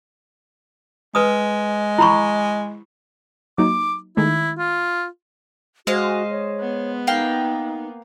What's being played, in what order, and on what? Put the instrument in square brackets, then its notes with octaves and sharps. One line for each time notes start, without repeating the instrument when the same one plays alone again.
[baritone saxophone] G#3 [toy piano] B4 D#6
[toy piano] E4 B5 C#6
[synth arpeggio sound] F#3 A#3 D#4 [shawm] D6
[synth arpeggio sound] D#3 G#3 A3 [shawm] E4
[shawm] F4
[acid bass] G#3 [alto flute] F#4 [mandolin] C5 D#5 F5
[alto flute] C#5
[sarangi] B3
[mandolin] A#3 F5 G5 [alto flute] D#4